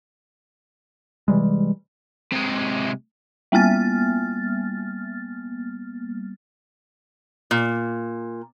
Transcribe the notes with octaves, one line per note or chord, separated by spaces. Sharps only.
C3 E3 G3 G#3
C3 G#3
G3 A#3 B3 F6 A6
A#2